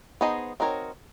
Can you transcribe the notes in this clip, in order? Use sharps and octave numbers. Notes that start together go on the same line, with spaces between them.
B3 D#4 G#4 C5 D#5
C4 D#4 F#4 A#4 C#5